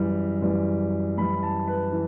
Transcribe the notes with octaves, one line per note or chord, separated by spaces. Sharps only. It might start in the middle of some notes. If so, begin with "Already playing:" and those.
Already playing: F#2 E3 G3
F#2 E3 G3
F#2 E3 G3 B5
A5
B4
E3